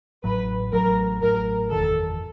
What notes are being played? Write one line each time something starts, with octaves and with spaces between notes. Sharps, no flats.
A1 A2 F#3 B4
A1 A2 F#3 A#4
A1 A2 F#3 A#4
F#1 E2 C3 D#3 A4